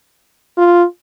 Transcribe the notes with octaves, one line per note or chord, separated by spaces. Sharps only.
F4